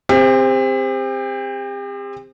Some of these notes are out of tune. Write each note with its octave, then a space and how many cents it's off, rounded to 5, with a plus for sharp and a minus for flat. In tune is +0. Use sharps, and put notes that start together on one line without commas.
C4 +0 G4 +40